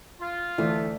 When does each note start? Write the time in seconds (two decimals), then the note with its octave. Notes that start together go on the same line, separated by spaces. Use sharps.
0.20 F4
0.58 D2 E3 A3